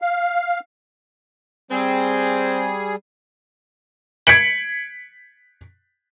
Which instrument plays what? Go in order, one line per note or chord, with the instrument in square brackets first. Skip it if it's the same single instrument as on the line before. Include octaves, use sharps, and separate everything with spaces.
[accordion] F5
[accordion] G3 G#4 [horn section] C4
[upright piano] G#6 B6 C#7 D7 F#7